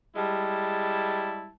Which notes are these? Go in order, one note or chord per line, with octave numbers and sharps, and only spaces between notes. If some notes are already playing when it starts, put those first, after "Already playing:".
G3 G#3 E4 A5